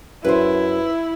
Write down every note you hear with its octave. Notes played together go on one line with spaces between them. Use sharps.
F#2 E4 B4 C5